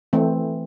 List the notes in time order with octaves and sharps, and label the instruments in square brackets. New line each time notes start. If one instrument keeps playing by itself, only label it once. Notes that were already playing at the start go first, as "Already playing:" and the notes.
[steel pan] E3 A3 C4